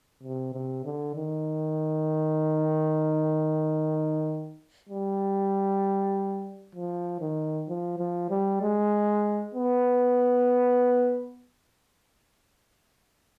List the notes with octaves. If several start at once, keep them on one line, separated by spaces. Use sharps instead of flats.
C3
C3
D3
D#3
G3
F3
D#3
F3
F3
G3
G#3
B3